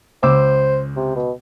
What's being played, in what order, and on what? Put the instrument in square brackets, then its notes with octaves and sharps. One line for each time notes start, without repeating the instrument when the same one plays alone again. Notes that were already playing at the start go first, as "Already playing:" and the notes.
[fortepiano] C#2 D6 E6 [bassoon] C5
[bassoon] C3
B2